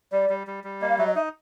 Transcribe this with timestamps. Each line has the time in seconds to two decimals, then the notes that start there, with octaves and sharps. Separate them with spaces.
0.12 G3 D5
0.29 G3
0.47 G3
0.64 G3
0.81 A#3 D#5
0.90 F5
0.98 F#3 E5
1.07 D#5
1.16 D#4 E5